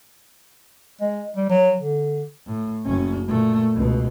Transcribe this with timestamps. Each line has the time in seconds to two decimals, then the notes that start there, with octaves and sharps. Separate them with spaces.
1.01 G#3
1.37 G3
1.49 F#3
1.78 D3
2.46 A2
2.85 F#1 C#4
3.27 A#2 A3
3.75 C#2 B2